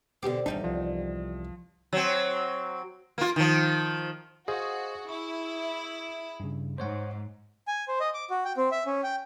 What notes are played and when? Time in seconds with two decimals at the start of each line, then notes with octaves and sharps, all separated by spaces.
0.23 B2 D3 C4 G4 D6
0.46 G#1 E2 G3 D4 D#4
0.64 C2 F3
1.93 F#3 C4
3.18 A#3 F4
3.36 D#3 F3
4.48 F#4 G#4 C5 D#5 F5
5.09 E4 C#6
6.40 G2 C#3
6.78 G#2 C5 C#5 F#5
7.67 G#5
7.88 C5
8.00 D#5
8.14 D6
8.30 F#4
8.45 G5
8.57 C4
8.71 E5
8.86 C#4
9.03 G5